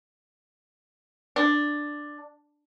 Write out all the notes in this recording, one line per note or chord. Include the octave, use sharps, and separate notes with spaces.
D4